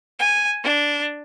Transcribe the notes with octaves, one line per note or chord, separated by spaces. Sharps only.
G#5
D4